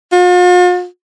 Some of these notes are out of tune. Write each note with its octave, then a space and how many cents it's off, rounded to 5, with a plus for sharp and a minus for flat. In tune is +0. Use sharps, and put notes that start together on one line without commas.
F4 +45